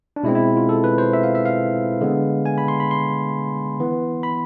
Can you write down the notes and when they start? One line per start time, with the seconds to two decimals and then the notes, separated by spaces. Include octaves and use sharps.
0.16 D4
0.23 B2 G#3 C4 E4
0.35 E4
0.57 F4
0.69 A4
0.84 B4
0.98 C5
1.13 E5
1.23 F5
1.35 E5
1.46 F5
2.01 D3 G#3 B3
2.46 G#5
2.58 B5
2.68 C6
2.80 B5
2.91 C6
3.80 E3 B3
4.23 B5